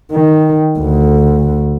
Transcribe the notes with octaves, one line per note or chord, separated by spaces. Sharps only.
D#3
D2